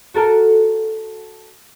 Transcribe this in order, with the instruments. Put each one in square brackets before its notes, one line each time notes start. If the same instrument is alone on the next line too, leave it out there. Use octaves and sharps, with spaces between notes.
[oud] F#4 A4 A#4